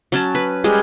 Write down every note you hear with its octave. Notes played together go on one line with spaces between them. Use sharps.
F#3 C#4 A5
B4
G3 G#3 G#4